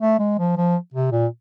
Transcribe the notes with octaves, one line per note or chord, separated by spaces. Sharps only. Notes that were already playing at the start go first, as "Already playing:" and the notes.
A3
G#3
F3
F3
C3
A#2